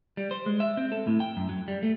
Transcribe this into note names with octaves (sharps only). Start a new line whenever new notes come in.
G3
C5
G#3
E5
C4
A4
A2
G5
F#2
F#3
G3
A3